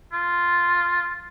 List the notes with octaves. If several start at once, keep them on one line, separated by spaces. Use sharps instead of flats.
F4